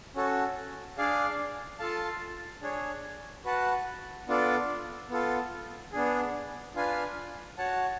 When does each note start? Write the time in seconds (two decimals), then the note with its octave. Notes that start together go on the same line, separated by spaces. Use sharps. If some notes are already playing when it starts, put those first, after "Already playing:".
0.15 C#4 F#4 A4
0.98 D4 G#4 D5 F5
1.79 F4 A4 F5 A5
2.62 D4 G#4 C#5
3.45 F#4 B4 F#5 A5
4.28 B3 D4 F4 A4 D5
5.09 B3 F4 A4
5.92 B3 D4 G#4
6.75 D4 F4 B4 F5 G#5
7.58 F#4 C#5 F#5 A5